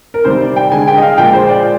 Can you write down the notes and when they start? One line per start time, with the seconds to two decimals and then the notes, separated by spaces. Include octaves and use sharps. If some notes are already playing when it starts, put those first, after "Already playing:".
0.14 A#4
0.24 C3 D#3 G3 C5
0.41 D5
0.56 G5
0.72 D3 G#3 G#5
0.87 G5
0.97 D#5
1.02 F5
1.18 A#2 F3 G#3 G5
1.33 C5
1.49 D5